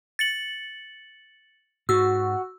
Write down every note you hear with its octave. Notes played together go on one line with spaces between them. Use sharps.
A6 C#7 F#7
G#2 F#4 E6